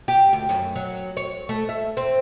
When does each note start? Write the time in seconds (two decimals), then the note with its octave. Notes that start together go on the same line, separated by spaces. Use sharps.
0.08 G4
0.33 D2
0.49 F#2
0.76 F#3
1.17 C#5
1.49 A3
1.69 E5
1.97 C4